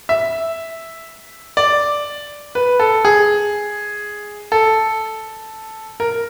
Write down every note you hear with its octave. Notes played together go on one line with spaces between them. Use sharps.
E5
D5
B4
A4
G#4
A4
A#4